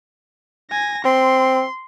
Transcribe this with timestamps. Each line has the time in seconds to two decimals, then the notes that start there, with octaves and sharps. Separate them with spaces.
0.71 G#5 A#6
1.05 C4 C6